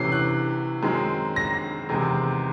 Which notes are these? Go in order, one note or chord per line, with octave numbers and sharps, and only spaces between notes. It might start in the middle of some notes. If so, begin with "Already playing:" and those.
Already playing: C3 E3 A3 C#4 C7
F#6
F#2 D#3 G#3 C4
A#6
E2 C3 D#3 G#3 C4